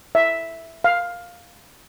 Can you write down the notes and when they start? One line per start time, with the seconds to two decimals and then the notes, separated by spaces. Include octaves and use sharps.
0.15 E5
0.84 F5